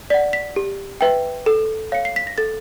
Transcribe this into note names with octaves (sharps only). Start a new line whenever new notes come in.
D5 F#5 B6
B6
G4
B4 E5 G5
A4
C#5 F5 C#7
C7
B6
A#6
A4 A6